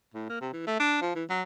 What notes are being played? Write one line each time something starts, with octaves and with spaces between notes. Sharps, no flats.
A2
A#3
C3
E3
A3
D4
F3
E3
F#3